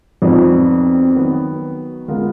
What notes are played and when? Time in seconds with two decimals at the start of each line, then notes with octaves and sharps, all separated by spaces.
0.22 F2 B3 D#4 F#4 D5
1.15 D#3 F#3 B3
2.08 D3 G#3 B3 F4 A#4